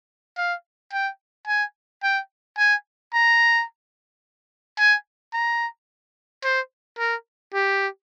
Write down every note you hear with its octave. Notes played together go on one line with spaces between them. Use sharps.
F5
G5
G#5
G5
G#5
A#5
G#5
A#5
C5
A#4
G4